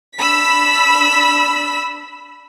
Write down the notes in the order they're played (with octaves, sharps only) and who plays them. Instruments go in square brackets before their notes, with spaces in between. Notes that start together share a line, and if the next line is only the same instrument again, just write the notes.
[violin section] D4 B5 E6 B6